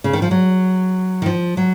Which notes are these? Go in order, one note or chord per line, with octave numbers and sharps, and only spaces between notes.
C#3
D#3
F3
F#3
D#3
F3
F#3